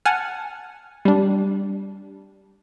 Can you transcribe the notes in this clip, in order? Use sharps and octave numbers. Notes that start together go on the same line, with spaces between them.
F#5 G#5 A5 F6
G3 D4